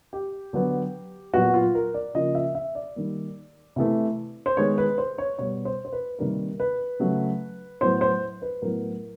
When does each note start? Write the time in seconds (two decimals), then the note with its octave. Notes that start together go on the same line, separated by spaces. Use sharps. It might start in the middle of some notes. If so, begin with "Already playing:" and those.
0.13 G4
0.53 D3 F#3 B3
1.33 A#2 F#3 B3 F#4
1.54 F4
1.75 A#4
1.94 D5
2.15 C#3 F3 A#3 D#5
2.35 E5
2.55 E5
2.75 D5
2.96 D#3 G3 A#3
3.76 C3 E3 A3
4.46 C5
4.57 D#3 G#3 B3 C#5
4.78 B4
4.98 C5
5.18 C#5
5.38 B2 G3 B3 C#5
5.65 C5
5.85 C5
5.92 B4
6.19 C3 D#3 G3 A#3 A#4
6.60 B4
7.00 C#3 F#3 A3
7.81 A2 F#3 B3 C5
8.01 C5
8.42 B4
8.62 A2 F#3 B3 A#4